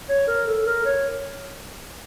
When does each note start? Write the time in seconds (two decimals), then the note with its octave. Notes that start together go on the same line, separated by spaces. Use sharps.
0.09 C#5
0.28 A#4
0.47 A4
0.67 A#4
0.85 C#5